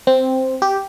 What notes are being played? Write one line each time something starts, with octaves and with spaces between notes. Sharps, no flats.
C4
G4